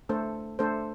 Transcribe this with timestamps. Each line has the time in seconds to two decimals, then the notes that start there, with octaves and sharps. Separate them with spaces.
0.09 A3 D4 A4 C5
0.59 A3 D4 A4 C5